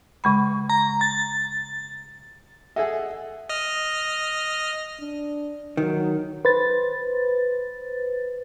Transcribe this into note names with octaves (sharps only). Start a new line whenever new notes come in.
C#3 G#3 B5
A#5
A6
G#4 A4 D#5 E5 F#5
D#5 F6
D4
D#3 F#3
B4 C5 A6